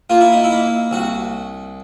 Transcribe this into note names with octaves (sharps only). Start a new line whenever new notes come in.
A#3 F4
E4
D#4
E4
A#3
C2 F#4